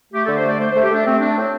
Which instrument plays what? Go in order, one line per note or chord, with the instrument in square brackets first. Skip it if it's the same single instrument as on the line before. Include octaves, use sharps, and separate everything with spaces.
[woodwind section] A3 G4
D3 A4
C5
A3 D5
A3 C5
A3 C5
G4
A3 D4
A3 C4
A3 D4
A2 C4